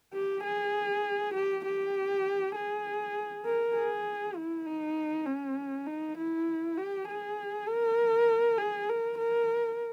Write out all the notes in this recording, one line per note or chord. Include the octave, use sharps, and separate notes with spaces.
G4
G#4
G4
G4
G#4
A#4
G#4
E4
D#4
C#4
D#4
E4
G4
G#4
A#4
G#4
A#4
A#4